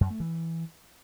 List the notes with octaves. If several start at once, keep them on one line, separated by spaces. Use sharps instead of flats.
F#2
A3
E3